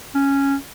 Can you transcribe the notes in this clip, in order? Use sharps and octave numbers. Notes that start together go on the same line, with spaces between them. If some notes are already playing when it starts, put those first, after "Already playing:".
C#4